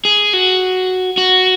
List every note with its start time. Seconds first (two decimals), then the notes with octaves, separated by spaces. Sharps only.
0.05 G#4
0.33 F#4
1.18 F#4